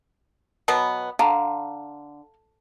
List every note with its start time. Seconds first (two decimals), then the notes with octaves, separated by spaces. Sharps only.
0.68 B2 F#3 B3
1.19 D3 F5 A#5